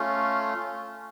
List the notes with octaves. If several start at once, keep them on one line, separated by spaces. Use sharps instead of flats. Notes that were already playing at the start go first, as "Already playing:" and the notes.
Already playing: A3 C#4 F4